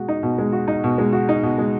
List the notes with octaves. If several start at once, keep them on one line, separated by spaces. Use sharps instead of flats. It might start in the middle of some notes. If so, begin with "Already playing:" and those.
Already playing: B2 G#3 F#4
D#4
B2
G#3
F#4
D#4
B2
G#3
F#4
D#4
B2
G#3